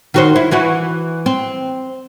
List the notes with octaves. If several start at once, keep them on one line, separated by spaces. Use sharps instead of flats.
D#3 F#4 C5
E4
E3 E4 F#4
C4